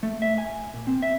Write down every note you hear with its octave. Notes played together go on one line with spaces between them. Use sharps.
A3
E5
G#5
A#2
C4
E5